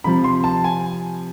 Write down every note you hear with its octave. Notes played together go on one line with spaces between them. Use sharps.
C3 F3 B5
C6
A5
G#5